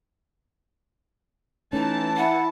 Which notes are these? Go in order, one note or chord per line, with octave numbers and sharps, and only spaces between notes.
E3 A3 C#4 D#4 A5
E4 F#5